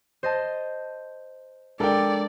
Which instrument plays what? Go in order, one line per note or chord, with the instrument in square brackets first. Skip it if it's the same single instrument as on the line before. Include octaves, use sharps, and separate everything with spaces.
[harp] C5 D#5 A5
[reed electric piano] G#3 D4 A#4 [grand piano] A4 G5 [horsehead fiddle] D5